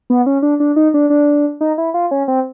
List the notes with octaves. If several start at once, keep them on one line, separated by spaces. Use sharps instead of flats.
B3
C#4
D4
D4
D#4
D4
D4
D#4
E4
F4
C#4
C4